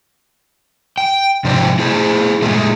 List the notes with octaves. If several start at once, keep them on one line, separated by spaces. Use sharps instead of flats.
G5
G#2 C3 F3 C5 D5 G5
E4 G#4 C5
A#2 G#3 A3